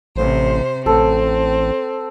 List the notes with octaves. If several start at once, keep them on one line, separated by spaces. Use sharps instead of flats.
A1 C3 C5
A1 C4 A4